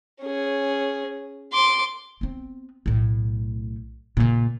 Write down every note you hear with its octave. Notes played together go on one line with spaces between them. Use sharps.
C#4 G#4
C6 D6
B3 C4
B1 A2
A#2 C#3